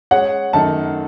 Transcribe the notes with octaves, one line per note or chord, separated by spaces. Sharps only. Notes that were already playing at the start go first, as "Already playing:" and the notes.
G#3 C#4 G#4 C#5 F#5
F#2 D#3 A3 A5